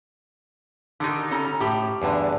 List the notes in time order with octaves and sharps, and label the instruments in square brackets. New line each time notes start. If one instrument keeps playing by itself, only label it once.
[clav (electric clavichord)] D3 D#4 [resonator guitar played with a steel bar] D#3 G4
[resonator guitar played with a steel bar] C#4 A4 A#5
[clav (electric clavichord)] A2 [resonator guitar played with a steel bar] G4
[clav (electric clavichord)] E2 G2 D3